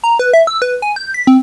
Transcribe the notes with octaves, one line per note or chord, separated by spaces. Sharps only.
A#5
B4
E5
E6
B4
G#5
G6
B6
C4